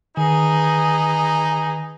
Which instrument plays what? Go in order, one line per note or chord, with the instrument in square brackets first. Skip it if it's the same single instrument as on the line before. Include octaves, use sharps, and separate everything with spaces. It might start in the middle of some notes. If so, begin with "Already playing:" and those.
[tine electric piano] D#3 [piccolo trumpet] D#4 [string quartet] G#4 B4